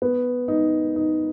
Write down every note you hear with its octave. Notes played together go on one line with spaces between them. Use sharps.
B3
D#4
D#4